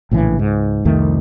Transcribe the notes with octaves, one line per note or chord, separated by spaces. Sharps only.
A#1 A2 C#3 E3
C#2 G#2
C2 F2 D#3 A3